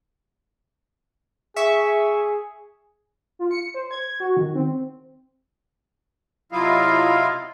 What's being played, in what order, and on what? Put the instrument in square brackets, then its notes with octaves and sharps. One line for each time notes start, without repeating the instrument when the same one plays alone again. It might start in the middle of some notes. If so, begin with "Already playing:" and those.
[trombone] G#4 [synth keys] E5 C#6
[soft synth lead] F4
C#7
C5
G#6
F#4
D#3
C4
[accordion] C3 F#3 E4 F4 D#5 F5